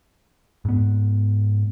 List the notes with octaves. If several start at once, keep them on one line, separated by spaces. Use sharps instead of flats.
G#2 B3